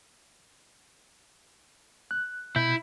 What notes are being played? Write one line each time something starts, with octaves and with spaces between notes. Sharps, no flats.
F#6
B2 E4 G6